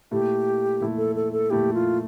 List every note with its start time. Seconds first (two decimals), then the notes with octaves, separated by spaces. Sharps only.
0.11 A#2 A3 E4 G4
0.81 A#2 A3 E4
0.98 A4
1.16 A4
1.33 A4
1.50 A#2 A3 E4 G4
1.74 F4